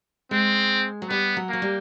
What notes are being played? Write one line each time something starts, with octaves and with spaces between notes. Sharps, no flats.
G#3 C4
F#3
G3 B3
F#3
F#3 A#3
G3